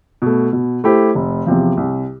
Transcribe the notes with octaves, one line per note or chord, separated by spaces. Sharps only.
B2 A3
B2
A3 E4 G4 C5
F1
E2 C3 F3
C2